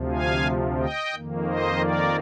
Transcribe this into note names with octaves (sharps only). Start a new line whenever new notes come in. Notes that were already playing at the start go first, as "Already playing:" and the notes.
Already playing: D2 C3 F3
F5 G#5
D#5 G5
F2 D#3 A#3
C5 D#5
A#4 D5